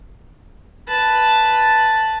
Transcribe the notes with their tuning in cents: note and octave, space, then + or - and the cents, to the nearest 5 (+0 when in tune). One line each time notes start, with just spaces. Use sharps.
B4 +0 A5 +0